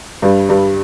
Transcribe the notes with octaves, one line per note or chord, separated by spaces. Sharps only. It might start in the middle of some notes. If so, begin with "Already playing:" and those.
G2 G3
G2 G3